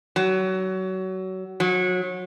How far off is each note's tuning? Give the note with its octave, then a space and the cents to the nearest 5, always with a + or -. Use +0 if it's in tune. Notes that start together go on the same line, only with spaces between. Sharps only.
F#3 +25
F#3 -25